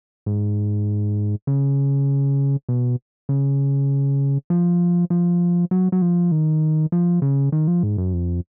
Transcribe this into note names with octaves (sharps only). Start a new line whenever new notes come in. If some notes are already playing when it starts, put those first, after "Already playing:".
G#2
C#3
B2
C#3
F3
F3
F#3
F#3
F3
D#3
F3
C#3
D#3
F3
G#2
F#2
F2